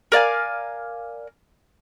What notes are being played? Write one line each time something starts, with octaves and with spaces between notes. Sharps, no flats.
A#4 D5 F5 G#5